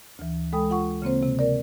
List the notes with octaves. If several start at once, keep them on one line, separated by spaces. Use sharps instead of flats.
D2 E3
G#3 A4 G5 B5 D#6
F4 F#5 C#6
C#3 A#3 C4 C5
C3
A#4 D5